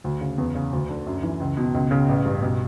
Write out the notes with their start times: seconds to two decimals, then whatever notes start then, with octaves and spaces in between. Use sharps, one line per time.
0.04 D2
0.21 C#3
0.38 E2
0.55 C#3
0.73 D2
0.89 D3
1.07 F#2
1.23 E3
1.40 C#2
1.57 B2
1.74 C#2
1.91 C#3
2.09 A1
2.26 G2
2.42 B1